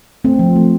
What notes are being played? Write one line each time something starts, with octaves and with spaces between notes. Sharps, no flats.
A3 C4
F3
A3